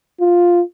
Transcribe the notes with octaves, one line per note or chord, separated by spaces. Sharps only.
F4